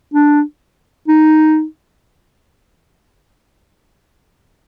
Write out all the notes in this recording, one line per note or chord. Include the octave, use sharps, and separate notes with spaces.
D4
D#4